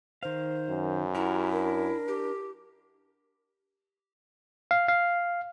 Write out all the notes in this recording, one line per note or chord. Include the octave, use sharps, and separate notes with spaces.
D#3 C5 F5
F#2
E4 F#4 G4 A#4
D4 A#4
G4
F5
F5